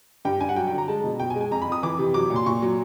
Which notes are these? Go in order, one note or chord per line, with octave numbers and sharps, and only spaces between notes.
G2 G5
G2 G#5
F#5
F#3 G5
G5
D3
A#5
G#3 A5
B2
B2 G5
G#5
G#3
G#5
F2 A#5
B5
F2 D#6
E3 D6
C3
F#3 D6
A#2
C6
A#2 C#6
F#3